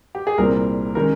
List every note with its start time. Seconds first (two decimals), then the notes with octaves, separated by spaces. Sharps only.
0.15 G4
0.27 G#4
0.38 C2 A#2 G3 C4 A#4
0.95 D#3 G#3 C#4 A#4